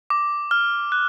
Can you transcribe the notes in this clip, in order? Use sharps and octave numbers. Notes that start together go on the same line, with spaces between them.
D6
F6
F#6